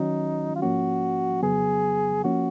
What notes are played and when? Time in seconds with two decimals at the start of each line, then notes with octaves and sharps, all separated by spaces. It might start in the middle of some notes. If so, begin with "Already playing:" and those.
Already playing: D#3 F#3 C#4 D#4 F#4
0.55 F4
0.62 G#2 F3 A#3 C#4 F#4
1.42 F2 C#3 F#3 B3 G#4
2.24 F3 A#3 C#4 F#4